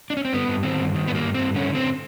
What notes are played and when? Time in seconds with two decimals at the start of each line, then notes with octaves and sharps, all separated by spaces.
0.10 D4
0.17 C#4
0.25 C4
0.33 G2 B3
0.48 G2
0.63 D#3 C4
0.79 G2
0.94 D#3
1.08 G2 B3
1.15 A#3
1.24 G2
1.35 G2 C4
1.54 D3 C#4
1.70 D3 C4